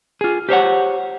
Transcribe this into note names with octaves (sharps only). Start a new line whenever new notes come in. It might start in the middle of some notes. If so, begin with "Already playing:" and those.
F4 G#4
G4 C5 C#5 F#5